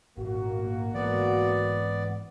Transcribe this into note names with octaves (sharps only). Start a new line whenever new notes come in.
G#1 A#2 A#3 F#4
G#2 E3 B3 D5